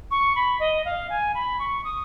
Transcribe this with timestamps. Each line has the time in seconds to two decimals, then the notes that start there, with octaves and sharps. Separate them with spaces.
0.11 C#6
0.35 B5
0.60 D#5
0.85 F5
1.10 G#5
1.35 B5
1.59 C#6
1.84 D#6